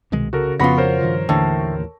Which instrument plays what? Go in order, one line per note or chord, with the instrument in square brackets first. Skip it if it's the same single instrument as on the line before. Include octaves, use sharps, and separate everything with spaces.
[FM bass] C2 [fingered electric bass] B2 D#3 G#3
[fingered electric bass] C#3 [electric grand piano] F#4 A4 A#4
[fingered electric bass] F2 F3 [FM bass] C#3 [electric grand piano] B3 B5 A#6 [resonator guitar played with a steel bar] F4 F#4
[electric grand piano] A#4 C5 C#5
[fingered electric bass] G2 D#3 F3
[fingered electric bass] A1 D#2 E3 [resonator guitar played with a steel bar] A2 [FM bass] D3